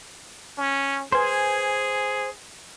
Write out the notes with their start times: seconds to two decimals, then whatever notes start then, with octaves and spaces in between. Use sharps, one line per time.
0.58 C#4
1.12 G#4 B4 C5 G#5 C6